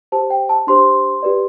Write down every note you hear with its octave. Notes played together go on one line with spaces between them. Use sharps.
G4 C5 A5
G5
A5
D4 G4 C5 C6
G4 B4 D5